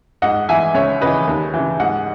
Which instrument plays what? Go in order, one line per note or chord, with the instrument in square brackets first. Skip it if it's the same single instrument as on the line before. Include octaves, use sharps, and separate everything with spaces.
[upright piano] G#2 D#5 F#5
E3 E5 G#5
C#2 C#5 E5
C#3 E3 B4 D#5
D#2
C#3 E3
G#2 D#5 F#5